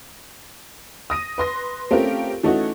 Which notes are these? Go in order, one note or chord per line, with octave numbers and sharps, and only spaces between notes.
D#6 A#6 D#7
B4 C6 A#6
A3 C4 C#4 F4 G4 A#4
E3 A3 C#4 D#4 F#4